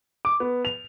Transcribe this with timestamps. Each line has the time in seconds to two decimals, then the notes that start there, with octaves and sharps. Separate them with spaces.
0.25 D6
0.40 B3
0.65 F7